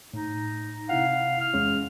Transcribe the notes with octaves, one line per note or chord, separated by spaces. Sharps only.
A2 D#4
C3 E4 F5 F#5
F6
E2 G#3 C#4